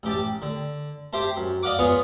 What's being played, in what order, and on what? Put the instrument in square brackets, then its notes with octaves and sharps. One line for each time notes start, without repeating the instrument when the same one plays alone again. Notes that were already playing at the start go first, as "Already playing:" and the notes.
[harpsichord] A1 G4 A5
D3
G4 C5 E5 A5
F#2
D5 D#5 F5 F#5 D6
B3 F4 G#4 B4 C#5